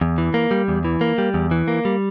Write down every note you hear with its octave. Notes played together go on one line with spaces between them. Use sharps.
E2
E3
A#3
G3
E2
E3
A#3
G3
E2
E3
A#3
G3